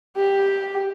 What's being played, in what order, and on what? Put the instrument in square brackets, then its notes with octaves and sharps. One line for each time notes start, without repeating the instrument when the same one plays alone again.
[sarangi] G4